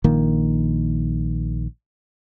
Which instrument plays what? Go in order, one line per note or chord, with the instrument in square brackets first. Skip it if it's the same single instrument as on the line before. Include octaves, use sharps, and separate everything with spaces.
[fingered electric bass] A#1 D#3 A#3